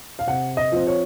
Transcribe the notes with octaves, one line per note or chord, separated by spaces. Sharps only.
F5
C3 F#5
D#5
F3 C4
C#5